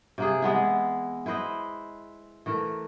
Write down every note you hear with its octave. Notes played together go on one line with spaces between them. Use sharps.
C3 A#3 G#4
E3 G#3 B3 E4
E4 B4 C5 D#5
E3 A3 A#4